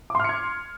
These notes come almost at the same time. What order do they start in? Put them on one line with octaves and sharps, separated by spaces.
D6 C6 F6 C#7 G#6